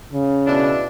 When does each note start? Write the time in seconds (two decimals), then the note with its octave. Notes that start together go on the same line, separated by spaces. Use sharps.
0.13 C#3
0.47 B2 D4 E4